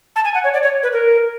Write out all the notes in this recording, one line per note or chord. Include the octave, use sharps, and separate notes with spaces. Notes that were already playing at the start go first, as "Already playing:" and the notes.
A5
G#5
F#5
C#5
D5
C#5
B4
A#4